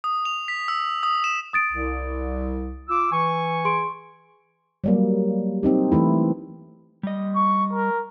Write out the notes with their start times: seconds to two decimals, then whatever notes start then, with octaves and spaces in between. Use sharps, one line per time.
0.04 D#6
0.25 F7
0.48 B6
0.68 E6
1.03 D#6
1.24 E7
1.53 D#6 A6 D7
1.73 C2
2.89 F4 D6 E6
3.12 E3 G#5 C#6
3.65 G#4 C6 D7
4.84 F#3 G3 A#3
5.63 C4 D#4 G4
5.92 E3 A3 E4
7.03 G3 D#5
7.36 C#6
7.73 A#4